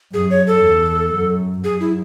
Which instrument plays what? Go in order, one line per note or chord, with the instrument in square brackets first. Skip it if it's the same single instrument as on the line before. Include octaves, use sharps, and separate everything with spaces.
[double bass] F#2 [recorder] G#4
[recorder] C#5
A4
[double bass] E2
F#2
[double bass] F#2 [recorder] G#4
[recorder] E4